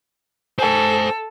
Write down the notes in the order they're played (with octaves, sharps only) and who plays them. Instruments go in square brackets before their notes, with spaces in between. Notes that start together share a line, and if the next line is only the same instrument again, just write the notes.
[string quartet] A4 [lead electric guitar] C5 G#5